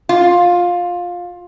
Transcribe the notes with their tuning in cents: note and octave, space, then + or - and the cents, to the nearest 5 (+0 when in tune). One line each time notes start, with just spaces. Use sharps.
F4 +15